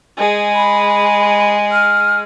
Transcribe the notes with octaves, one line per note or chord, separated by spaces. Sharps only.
G#3 G#4
B5
F6